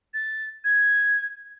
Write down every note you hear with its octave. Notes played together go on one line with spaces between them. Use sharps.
A6
G#6